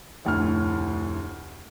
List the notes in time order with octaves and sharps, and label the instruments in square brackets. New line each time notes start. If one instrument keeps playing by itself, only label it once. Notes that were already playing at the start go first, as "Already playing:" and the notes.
[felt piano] F1 D2 A2 F6